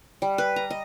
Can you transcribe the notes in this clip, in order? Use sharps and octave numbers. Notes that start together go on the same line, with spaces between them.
G3
B4
A#5
D#5